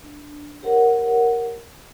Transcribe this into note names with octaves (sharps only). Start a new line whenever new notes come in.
D4
G4 A#4 C5 C#5 F#5